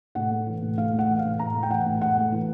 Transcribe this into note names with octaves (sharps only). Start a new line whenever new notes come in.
A2 F#5
A3
E3
A2
A2 F5
A3
F#5
E3
F5
A2
A2 A#5
A3
G5
E3 F#5
A2
A2 F#5
A3
E3